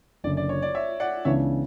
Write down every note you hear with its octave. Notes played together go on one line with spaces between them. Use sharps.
F#1 F#2 D3 D5
D5
C#5
D5
C#5 E5
D5 F#5
C#2 C#3 E3 B3 D4 C#5 E5